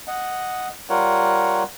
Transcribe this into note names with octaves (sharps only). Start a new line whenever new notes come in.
D#5 F#5
G3 F4 A#4 C#5 F#5